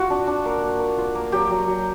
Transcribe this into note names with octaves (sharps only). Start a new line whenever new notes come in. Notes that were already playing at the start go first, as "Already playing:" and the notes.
Already playing: F4 F#4
D4
D4
A#3
A#3
A#3
F4
A#3
F#3 G4
F#3
F#3